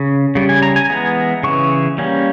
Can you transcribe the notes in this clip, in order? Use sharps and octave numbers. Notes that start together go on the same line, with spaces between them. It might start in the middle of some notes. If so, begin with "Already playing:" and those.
Already playing: C#3
C#3 G3
G#5
A#5
G#5
E3 G#3 B3 A#5
C#3 E3 C#6
G3 A#3 C#4